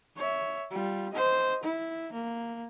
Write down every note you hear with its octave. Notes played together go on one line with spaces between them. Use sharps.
C#5 E5
G3 F4
C5 D#5
E4
A#3